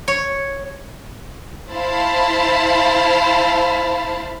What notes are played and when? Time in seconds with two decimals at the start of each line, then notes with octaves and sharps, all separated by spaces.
0.08 C#5
1.72 E4 C5 F5 A5 B5